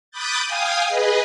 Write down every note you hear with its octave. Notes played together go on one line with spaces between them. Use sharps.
B5 D6 D#6 F#6 G6 A6
F5 G5 G#5 D#6
G#4 B4 D#5